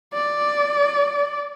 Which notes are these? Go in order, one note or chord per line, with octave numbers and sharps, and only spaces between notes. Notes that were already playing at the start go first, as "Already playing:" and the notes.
D5